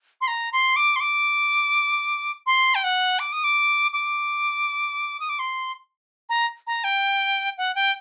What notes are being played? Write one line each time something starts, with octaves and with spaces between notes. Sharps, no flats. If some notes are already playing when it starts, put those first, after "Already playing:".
C6
A#5
C6
D6
C6
D6
C6
G5
F#5
D6
D#6
D6
D6
D#6
D6
C6
A#5
A#5
G5
F#5
G5